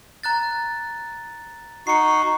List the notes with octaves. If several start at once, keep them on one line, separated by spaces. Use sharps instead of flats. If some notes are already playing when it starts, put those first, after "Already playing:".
A#5 F#6 A6
D#4 F#4 C7 C#7